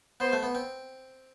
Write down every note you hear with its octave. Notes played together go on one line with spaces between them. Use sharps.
B3 C5
A3
B3
C4